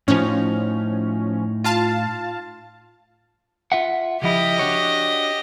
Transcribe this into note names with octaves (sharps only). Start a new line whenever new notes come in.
A2 F3 C#4 D#4
F4 F5 A5
F4 E5 F#5
C#2 F3 E4 G4 D#5
D4 F#4 C#5